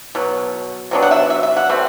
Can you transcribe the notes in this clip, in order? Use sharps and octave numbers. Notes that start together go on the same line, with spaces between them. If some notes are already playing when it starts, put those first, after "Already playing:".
B2 F#3
C3 F#3 B3 D4
F#5
E5
E5
E5
F#5
B2 A3 C4